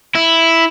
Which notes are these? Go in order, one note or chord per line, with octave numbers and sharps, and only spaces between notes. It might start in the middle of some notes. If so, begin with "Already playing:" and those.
E4